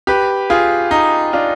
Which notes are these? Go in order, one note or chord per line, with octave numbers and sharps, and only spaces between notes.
G4 B4
F4 G#4
D#4
D4 F4